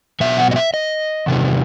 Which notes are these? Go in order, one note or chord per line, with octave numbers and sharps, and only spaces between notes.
B2 F#3 B3 E5
F#5
D#5
E5
D#5
E2 C3 D#3 G3